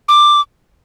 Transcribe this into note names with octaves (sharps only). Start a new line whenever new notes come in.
D6